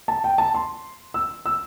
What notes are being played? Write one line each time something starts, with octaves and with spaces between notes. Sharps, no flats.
A5
G5
A5
C6
E6
E6